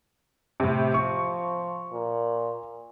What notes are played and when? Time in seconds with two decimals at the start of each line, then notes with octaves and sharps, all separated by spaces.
0.60 A2 C3
0.94 F3 C#6
1.92 A#2